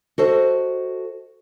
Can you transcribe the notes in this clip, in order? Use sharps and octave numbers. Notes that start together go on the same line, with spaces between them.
F#4 A4 C5 D#5